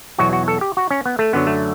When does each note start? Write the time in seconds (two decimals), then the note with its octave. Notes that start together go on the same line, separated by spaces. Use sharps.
0.18 E2 B2 F#3 F#4
0.33 F#4
0.48 A4
0.61 G4
0.77 F#4
0.90 C#4
1.06 B3
1.19 A3
1.33 F#2 D3 F#3 B3
1.47 A3